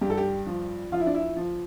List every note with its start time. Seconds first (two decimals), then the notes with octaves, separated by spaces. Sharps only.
0.01 G2 G4
0.10 A4
0.17 G4
0.46 F3
0.92 F3 F4
1.00 E4
1.06 D4
1.14 E4
1.36 F3